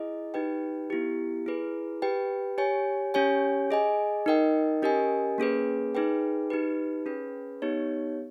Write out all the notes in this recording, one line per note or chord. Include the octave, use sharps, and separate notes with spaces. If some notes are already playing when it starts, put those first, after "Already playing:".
Already playing: E4 G#4 D#5
D#4 G4 B4 G5
B3 E4 G4
E4 G#4 B4
G4 B4 G5
G4 C#5 G#5
C#4 G4 C#5 G#5
G#4 D#5 G#5
D#4 A#4 D#5 G5
C#4 G4 A#4 D#5 G#5
A#3 C#4 G#4 B4
D#4 G#4 B4 G5
D#4 G4 B4
C#4 G#4 B4
B3 D#4 G4 C#5